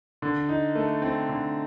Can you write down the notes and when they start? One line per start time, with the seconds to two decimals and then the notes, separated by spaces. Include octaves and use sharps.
0.22 D3
0.49 D#4
0.75 A3
1.02 C4
1.29 D3